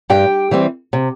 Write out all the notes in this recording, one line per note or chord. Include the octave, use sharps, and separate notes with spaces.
G2 G4 G5
E3 G3 C4
C3